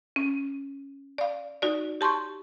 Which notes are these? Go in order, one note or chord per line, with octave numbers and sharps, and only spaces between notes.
C#4
D5 F5
D#4 F#4 D5
G4 A5 C6 C#6 G6